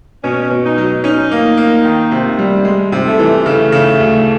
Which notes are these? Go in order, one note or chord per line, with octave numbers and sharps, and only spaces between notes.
B2 C#4
B2
D#4
F#3
C#4 D#4
A#3
A#3
D#3
C3
G3
G#3
C3
A3
E3
C#3 A3
C#3
D2